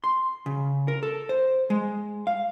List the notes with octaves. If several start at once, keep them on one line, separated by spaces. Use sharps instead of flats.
C6
C#3
A#4
A4
C5
G#3
F5